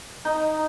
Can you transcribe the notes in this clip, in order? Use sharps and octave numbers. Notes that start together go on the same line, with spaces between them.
D#4